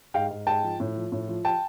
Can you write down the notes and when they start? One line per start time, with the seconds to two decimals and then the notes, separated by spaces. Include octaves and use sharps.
0.14 G#2 F5 G5
0.30 G#2
0.47 G#2 G5 A5
0.63 F3
0.80 A2
0.96 F3
1.12 A2
1.28 F3
1.45 G5 A5